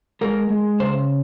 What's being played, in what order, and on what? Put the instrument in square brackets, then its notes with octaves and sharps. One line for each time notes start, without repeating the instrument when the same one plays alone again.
[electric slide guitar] G#3 A#4
G#3
C#3 C5